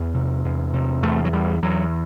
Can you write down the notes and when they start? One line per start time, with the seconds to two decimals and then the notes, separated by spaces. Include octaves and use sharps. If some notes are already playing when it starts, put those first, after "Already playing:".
Already playing: E2 B3
0.14 C3
0.44 E2
0.73 C3
1.02 E2 A3
1.25 F#3
1.33 E2 G3
1.62 E2 F#3